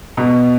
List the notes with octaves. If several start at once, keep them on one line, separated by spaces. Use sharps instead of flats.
B2